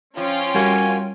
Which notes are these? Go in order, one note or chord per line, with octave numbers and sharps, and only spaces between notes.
F3 C#4 F4 G5
F2 G3 A#3 F#4 G#5